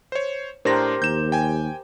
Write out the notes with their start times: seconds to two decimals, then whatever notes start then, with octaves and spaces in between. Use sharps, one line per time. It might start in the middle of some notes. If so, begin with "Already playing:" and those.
0.12 C5 C#5
0.65 A2 D4 G4 A#4 C5 A#6
1.02 D#2 G6 E7
1.32 G5 G#5